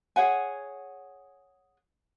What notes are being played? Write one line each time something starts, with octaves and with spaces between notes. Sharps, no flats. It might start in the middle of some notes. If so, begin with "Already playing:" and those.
G#4 C#5 F#5 G#5